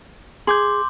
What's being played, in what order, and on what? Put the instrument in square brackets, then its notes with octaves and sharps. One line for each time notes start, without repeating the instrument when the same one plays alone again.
[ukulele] G#4 [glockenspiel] C6 D6 G6